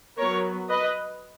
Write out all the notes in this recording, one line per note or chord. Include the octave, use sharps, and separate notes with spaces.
F#3 B3 A#4 C#5
B4 D#5